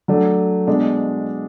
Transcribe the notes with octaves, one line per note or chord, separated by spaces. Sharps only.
F#3 A3 D4
B2 G#3 D4